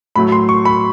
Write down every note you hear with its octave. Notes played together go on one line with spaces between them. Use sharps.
A2 F#3 A3 B5
C6
C#6
B5